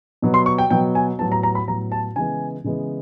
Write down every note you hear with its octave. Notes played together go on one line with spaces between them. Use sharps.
B2 F#3 B3
C6
C#6
G5
B2 F#3 B3 G5
G#5
A2 F#3 B3 A5
A#5
A#5
B5
A2 F#3 B3 A#5
A5
C#3 E3 G#3 B3 G#5
C#3 E3 G#3 B3